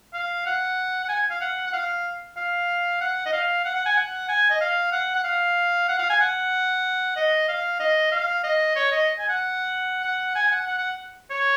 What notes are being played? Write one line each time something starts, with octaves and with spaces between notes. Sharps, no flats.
F5
F#5
F#5
G#5
F5
F#5
F#5
F5
F5
F#5
D#5
F5
F#5
F#5
G#5
F#5
G#5
D#5
F5
F#5
F#5
F5
F#5
F5
G#5
F#5
D#5
F5
D#5
F5
D#5
C#5
D#5
G#5
F#5
F#5
G#5
G#5
F#5
F#5
F#5
C#5